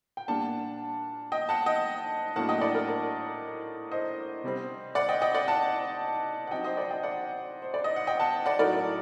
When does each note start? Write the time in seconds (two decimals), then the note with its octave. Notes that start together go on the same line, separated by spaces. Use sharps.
0.17 G5
0.28 A#2 G3 A#3 D4 F#5 A5
1.32 D#5 G5
1.49 F#5 A5
1.66 D#5 G5
2.36 A2 F#3 A#3 D4 F#5 A5
2.49 D#5 G5
2.61 D5 F#5
2.75 A#4
2.88 A#4
3.91 C5 D#5
4.44 C3 G3 C4
4.95 D5 F#5
5.09 D#5 G5
5.22 D#5 G5
5.35 D5 F#5
5.48 F#5 A5
6.47 F#5
6.51 F#3 C4 D#4 D#5 G5
6.64 C5 D#5
6.77 D5 F#5
6.91 D#5 G5
7.03 D5 F#5
7.62 C5
7.74 D5
7.84 D#5
7.96 F#5
8.07 D#5 G5
8.20 F#5 A5
8.46 D5 F#5
8.59 A2 F#3 A3 D#4 A#4 D5